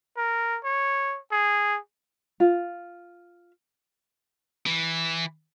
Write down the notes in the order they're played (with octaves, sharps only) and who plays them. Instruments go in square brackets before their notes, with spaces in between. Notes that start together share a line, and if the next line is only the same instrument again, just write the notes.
[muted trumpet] A#4
C#5
G#4
[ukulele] F4
[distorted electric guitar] E3